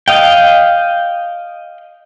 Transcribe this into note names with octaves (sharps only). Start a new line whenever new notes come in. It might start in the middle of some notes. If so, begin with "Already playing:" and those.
D#5 F5 G5